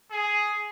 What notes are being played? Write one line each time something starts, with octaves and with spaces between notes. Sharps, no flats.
G#4